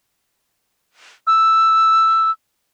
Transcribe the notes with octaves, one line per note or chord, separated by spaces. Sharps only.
E6